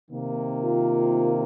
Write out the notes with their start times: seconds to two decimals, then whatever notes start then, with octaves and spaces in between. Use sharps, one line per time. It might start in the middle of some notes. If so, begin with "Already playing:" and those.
0.11 C3 D#3 A#3
0.62 F4